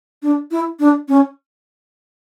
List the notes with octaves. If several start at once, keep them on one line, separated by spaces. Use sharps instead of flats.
D4
E4
D4
C#4